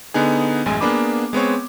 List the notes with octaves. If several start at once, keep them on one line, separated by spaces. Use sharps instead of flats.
D3 B3 D#4 G#4
A1 F#2 G#3 G#5
A#3 B3 D4 G#4 B5 D6
G#3 B3 C4 C#5